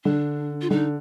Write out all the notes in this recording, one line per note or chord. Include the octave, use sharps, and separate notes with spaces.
D3 D4
F4
D3 D#4